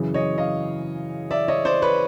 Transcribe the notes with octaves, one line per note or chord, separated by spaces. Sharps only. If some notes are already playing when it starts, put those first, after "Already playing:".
Already playing: F#2 C#3 E3
C#5 D#5
D#5 F5
D5 E5
C#5 D#5
C5 D5
B4 C#5